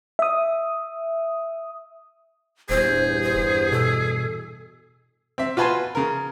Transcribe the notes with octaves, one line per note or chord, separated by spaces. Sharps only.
E5 D#6
D#1 E2 G2 G#4 C5
C5
B2 A4
C4 E5
F4 F#4 B4 G#5 A5 C6
C#3 A#4